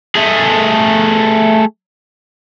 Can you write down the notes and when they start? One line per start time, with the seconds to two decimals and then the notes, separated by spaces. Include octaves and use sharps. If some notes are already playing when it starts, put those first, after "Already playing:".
0.16 A3 G#4